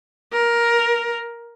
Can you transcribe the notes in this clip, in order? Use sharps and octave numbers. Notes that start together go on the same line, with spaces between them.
A#4